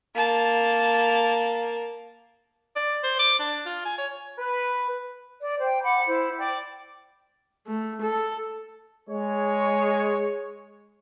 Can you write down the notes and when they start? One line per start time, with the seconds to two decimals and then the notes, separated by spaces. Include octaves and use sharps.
0.15 A#3 A5
2.76 D5
3.04 C5
3.19 D6
3.40 D4
3.66 F4
3.85 G#5
3.98 C#5
4.39 B4
5.40 D5
5.60 C5 G5
5.82 F#5 B5 D6
6.06 E4 C5
6.38 D5 G5 D6
7.67 A3
8.02 A4
9.08 G#3 C#5